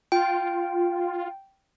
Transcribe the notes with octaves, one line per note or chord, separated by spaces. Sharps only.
F4 G5